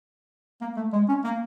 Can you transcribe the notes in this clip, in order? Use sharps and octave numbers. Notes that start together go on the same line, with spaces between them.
A#3
A3
G#3
C#4
A#3